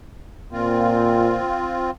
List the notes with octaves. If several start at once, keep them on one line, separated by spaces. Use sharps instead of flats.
A#2 C4 F4